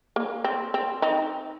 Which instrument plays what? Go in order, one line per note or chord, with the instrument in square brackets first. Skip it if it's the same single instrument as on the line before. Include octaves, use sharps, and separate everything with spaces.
[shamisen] A#3
C4
C4
C4 D#4